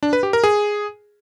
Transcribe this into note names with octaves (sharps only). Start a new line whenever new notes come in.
D4
B4
G4
A#4
G#4